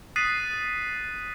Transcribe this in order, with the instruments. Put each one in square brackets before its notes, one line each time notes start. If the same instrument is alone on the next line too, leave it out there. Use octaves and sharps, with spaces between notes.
[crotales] D#6 F#6 A6 B6 C7 D#7